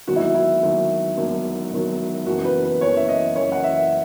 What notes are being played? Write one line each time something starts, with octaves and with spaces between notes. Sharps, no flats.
E1 D#2 D#3 F#3 F#4
E4
E4
E1 D#2 D#3 F#3
E1 D#2 D#3 F#3
E1 D#2 D#3 F#3
F#1 F#2 E3 F#4
B4
B4
F#1 F#2 E3 C#5
E5
D#5
F#1 F#2 E3 C#5
F#5
E5